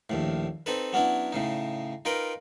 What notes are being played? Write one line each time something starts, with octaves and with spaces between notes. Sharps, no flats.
A#1 D#2 A2
C4 D#4 A4 B4
F#3 B3 C#4 D4 E4
A2 C#3 D#4
D#4 F4 A#4 B4 G5